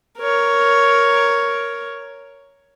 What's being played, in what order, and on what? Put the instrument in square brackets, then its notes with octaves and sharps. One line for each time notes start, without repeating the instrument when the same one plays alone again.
[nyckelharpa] A#4 C#5